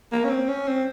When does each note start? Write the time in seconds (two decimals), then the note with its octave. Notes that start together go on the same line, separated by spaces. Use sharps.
0.12 A#3
0.24 C#4
0.30 C4
0.48 C#4
0.67 C4